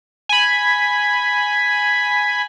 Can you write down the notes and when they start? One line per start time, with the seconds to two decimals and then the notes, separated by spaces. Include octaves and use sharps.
0.29 G#5 B5